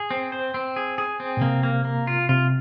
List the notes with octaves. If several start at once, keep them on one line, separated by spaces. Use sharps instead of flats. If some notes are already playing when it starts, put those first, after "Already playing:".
Already playing: G#4
C4
C5
C4
G#4
G#4
C4
A#2
C3 A#3
A#3
A#3
F4
C3 F4